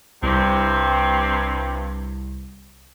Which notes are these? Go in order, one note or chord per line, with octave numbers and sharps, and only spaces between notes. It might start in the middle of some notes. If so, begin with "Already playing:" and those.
C2 G2 C3 C4